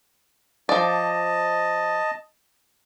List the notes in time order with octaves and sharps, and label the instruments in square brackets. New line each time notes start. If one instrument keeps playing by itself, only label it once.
[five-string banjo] F3 D5 [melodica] D#5 A5